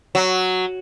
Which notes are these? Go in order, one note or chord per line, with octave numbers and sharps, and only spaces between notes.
F#3